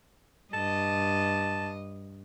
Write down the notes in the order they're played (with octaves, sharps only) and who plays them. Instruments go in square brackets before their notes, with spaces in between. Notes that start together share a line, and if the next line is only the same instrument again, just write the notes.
[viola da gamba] G2 D#5 [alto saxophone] A5